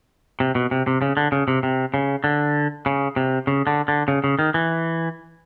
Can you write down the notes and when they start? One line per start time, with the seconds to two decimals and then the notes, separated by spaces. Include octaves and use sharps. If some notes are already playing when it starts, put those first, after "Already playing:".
0.40 C3
0.55 B2
0.71 C3
0.87 C3
1.02 C#3
1.17 D3
1.32 C#3
1.48 C3
1.63 C3
1.94 C#3
2.24 D3
2.86 C#3
3.16 C3
3.47 C#3
3.67 D3
3.88 D3
4.08 C#3
4.24 C#3
4.39 D#3
4.54 E3